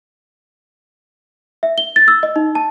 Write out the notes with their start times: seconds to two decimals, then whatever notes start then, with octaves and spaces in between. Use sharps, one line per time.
1.63 E5
1.78 G7
1.96 A6
2.08 E6
2.23 D#5
2.36 D#4
2.55 A5